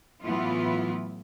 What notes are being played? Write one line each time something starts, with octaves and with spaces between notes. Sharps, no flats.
A2 E3 F#3 B3 E4 F4